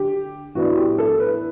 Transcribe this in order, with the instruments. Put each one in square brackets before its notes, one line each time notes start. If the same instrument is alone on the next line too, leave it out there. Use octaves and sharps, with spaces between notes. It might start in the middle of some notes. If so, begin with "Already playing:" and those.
Already playing: [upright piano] D3 G4
A2 E3 B3 D4 F#4
G4
A4
B4